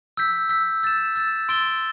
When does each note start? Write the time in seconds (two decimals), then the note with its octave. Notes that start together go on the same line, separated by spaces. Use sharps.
0.17 E6 G6 B6
0.49 E6 G6 B6
0.83 E6 A6 E7
1.15 E6 A6 E7
1.49 C6 E6 A6 D7 G7